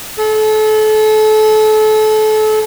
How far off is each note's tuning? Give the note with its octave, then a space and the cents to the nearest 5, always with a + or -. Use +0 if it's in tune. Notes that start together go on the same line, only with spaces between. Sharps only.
A4 -30